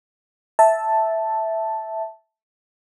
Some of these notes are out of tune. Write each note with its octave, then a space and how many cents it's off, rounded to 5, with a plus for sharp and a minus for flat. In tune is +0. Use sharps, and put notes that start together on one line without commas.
E5 -5 A5 +0